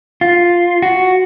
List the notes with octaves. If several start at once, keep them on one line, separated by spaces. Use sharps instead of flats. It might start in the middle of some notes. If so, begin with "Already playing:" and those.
F4
F#4